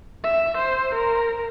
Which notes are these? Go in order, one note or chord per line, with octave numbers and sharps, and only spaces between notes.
E5
C5
A#4